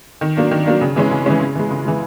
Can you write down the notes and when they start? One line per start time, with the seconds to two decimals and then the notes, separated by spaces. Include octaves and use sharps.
0.21 D#3
0.37 F#3 A#3 D4
0.51 D#3
0.66 F#3 A#3 D4
0.81 C#3
0.96 E3 G#3 C#4
1.11 C#3
1.26 E3 G#3 C#4
1.40 C#3
1.55 E3 G#3
1.70 C#3
1.85 E3 G#3